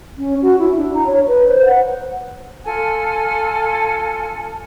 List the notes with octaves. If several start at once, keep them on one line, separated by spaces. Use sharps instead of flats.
C#4
F#4
E4
D4
A#5
C#5
B4
C5
F#5
F4 A4 G#5